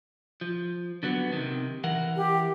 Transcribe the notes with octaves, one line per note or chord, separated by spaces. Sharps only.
F3
D3 F#3 B3
C3 D#3
E3 A#4 F#5
G4